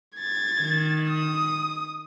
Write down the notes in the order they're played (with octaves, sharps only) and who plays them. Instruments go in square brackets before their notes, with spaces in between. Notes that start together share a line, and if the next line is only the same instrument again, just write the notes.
[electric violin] G#6 A6
[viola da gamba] D#3
[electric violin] D#6